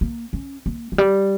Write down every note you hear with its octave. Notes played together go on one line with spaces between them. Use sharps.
A#3
C#4
A#3
F3
G3